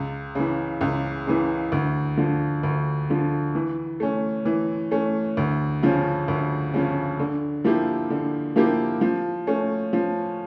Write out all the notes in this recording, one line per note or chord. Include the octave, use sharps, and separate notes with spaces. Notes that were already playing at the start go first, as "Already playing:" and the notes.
Already playing: C#2
C#3 E3
C#2
C#3 E3
D2
D3 F3
D2
D3 F3
E3
A3 C#4
E3
A3 C#4
D2
C#3 F3 C#4
D2
C#3 F3 C#4
D3
F3 A#3 E4 G4
D3
F3 A#3 E4 G4
F3
A3 C#4
F3